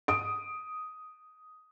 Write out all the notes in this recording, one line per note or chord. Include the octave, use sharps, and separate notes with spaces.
D#6 D7